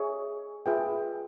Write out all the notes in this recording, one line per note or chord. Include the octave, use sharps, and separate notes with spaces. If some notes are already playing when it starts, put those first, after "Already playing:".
Already playing: G#4 C#5 E5 G#5
F4 G#4 B4 E5 G5